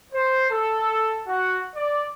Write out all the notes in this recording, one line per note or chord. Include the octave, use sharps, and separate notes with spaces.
C5
A4
F#4
D5